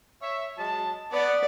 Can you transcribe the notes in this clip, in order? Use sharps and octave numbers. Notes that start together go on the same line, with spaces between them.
C#5 E5
F#3 G#3 A5
B3 D5